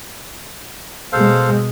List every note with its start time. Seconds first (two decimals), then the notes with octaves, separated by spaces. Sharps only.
1.13 B2 G#3 A4 C5 F5